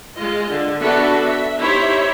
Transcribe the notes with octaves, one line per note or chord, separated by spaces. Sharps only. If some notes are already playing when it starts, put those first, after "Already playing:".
G#3 F4 D#5
D3
B3 D4 F#4 A4 E5
E5
D#4 E4 G4 C5 C#5 E5